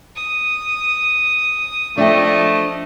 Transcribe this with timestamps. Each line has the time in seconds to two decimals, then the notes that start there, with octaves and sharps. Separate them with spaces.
0.15 D#6
1.98 F3 A3 D4 D#5 E5 G5